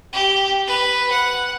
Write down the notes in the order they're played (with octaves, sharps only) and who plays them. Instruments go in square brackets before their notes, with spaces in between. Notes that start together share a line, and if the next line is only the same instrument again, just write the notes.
[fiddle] G4
B4
F#5